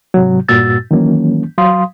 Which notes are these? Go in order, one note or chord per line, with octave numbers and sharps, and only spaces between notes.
G#2 C3 F#3
G2 A#2 F#4 E6 A6
D#3 E3 F#3 A#3 C#4
F#3 F5 C6 D#6